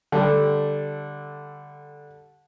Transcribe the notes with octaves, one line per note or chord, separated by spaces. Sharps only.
D3 G3 A3